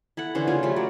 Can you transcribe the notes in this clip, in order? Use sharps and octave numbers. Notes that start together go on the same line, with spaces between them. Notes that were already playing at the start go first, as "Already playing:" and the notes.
E4 A4 F#5
D3 E3 C#4 C5
C#3 F#3 F4 G#5
F3 G3 A3
F#3 D5